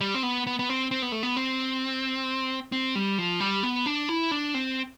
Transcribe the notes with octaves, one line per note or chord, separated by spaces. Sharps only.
G3
C4
B3
B3
B3
C4
C4
B3
A3
B3
C4
C4
G3
F3
G3
B3
D4
E4
D4
C4